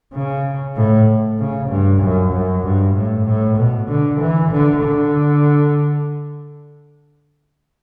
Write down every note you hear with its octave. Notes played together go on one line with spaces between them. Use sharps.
C#3
A2
C#3
G2
F#2
F#2
G2
A2
A2
B2
D3
E3
D3
D3